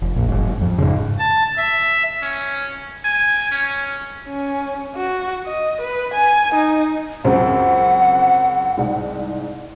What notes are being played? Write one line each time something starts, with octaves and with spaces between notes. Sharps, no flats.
F1
A#1
F#1 G#2
F2
G#2 C#3
A5
E5
C#4
G#5
C#4
C#4
F#4
D#5
B4
G#5
D#4
C#2 F#2 C4 F#5
C2 G#2